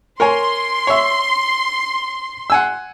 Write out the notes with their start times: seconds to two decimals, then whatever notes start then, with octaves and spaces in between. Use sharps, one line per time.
0.20 A#4 C#5 G#5 C6
0.87 C#5 E5
2.50 F#5 G#5 E6